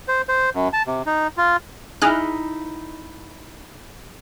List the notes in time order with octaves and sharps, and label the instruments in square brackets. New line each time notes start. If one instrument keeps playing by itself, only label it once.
[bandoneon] C5
C5
F#2
A5
C3
D#4
F4
[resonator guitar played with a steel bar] D#4 E4 [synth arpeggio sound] G#4 F6 F#6